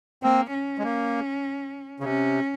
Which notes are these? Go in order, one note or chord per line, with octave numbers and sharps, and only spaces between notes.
A#3 C4
C#4
G#3
A#3
C#3
C3 C#4